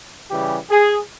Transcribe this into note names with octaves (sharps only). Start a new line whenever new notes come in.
C#3 E3 G3 G4
G#4